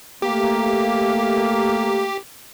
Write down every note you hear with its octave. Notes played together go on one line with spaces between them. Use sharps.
A3 A#3 G4